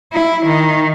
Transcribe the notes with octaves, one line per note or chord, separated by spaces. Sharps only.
E4
D#3